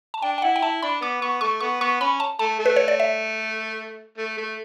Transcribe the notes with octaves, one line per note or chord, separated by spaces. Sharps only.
A5
D4 G5
G5
E4 F#5
G5
E4 A5
D4 B5
B3 D6
B3 C#6
A3 C#6
B3 C#6
B3 C#6
C#4 B5
A5
A3 A5
A3
B4
C#5
D5
E5
A3
A3